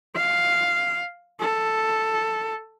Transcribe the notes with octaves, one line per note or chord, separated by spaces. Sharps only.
F5
A4